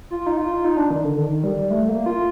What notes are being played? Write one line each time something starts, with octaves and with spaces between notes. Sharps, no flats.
F4
D#4
F4
D#4
D4
D#3
D3
D#3
G3
A3
A#3
F4